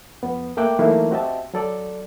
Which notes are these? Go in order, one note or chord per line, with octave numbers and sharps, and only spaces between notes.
F2 B3
A3 A#3 E5 G5 D6 F#6
E3 F#3 A3 A#3 D#4 E4
C4 F#4 G4 D#5 E5 A5
F#3 A4 D5